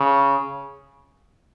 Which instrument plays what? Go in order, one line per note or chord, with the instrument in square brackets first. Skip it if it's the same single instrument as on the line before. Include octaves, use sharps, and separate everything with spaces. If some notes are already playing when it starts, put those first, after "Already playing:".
Already playing: [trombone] C#3